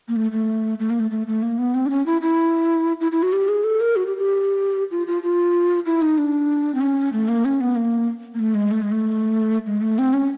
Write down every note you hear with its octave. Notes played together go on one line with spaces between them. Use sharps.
A#3
A3
A3
A3
A#3
A3
A3
A3
A#3
B3
C4
D4
C#4
E4
E4
E4
E4
F#4
G4
G#4
A4
A#4
F#4
G4
G4
F4
F4
F4
E4
D#4
D4
C4
C#4
A3
A#3
C#4
B3
A#3
A#3
A3
G#3
A3
G#3
A3
G#3
A3
C4
C#4